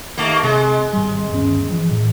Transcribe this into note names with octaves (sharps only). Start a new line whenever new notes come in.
D#2 A3 A#3
C3 G#3
G#1 G3
G1 D#2 C#4
E3 F3
A2